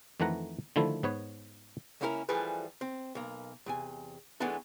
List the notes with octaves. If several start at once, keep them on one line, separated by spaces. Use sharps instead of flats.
F2 D#3 E3 A3 F#5 A#5
D3 D#3 F3 A3 E4
G#2 B3 B4 C#5
C#2 A#3 C#4 E4 G4 A#4
E3 F3 G3 A3 G#4 B4
C4
B1 A#3
E2 C3 G#5
E3 G#3 A3 B3 D4 A4